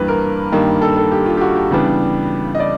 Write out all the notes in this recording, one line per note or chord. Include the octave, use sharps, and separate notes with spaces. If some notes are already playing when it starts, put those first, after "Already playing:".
Already playing: G2 E3 G3 A#3 B4
A#4
G2 D#3 G3 A#3
A4
A4
G4
F4
G4
F#4
G4
C#3 E3 G3 B3 D4
D#5
D5